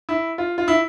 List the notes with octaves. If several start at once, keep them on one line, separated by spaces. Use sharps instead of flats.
E4
F4
F4
E4